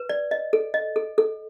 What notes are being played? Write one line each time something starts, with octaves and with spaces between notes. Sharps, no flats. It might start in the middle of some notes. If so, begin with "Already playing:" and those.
Already playing: B4
D5
D#5
A4
D#5
A4
A4